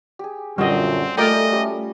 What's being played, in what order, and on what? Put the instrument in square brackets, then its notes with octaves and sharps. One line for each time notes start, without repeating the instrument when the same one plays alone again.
[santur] G4 G#4
[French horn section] F#2 A#2 D3 [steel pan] G3 D#5 [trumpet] C4 [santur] F#4 C6
[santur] G3 F4 G#5 [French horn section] A3 [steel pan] A#4 D5 G5 [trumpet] D#5
[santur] G3 C#4 G4